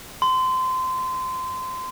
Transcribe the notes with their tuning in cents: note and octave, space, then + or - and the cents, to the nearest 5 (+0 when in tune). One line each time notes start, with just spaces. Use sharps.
C6 -25